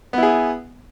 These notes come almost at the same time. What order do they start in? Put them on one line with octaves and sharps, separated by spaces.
B3 E4 G#4